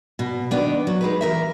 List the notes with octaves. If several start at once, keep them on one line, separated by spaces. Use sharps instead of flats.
B2
D#3 B3 D4
F#3
G#3 D#4 B4
E3 A#4 E5